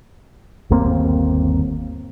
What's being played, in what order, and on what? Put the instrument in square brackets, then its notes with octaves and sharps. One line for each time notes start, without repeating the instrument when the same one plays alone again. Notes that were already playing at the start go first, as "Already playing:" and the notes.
[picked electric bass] G1 D#2 A#3 C4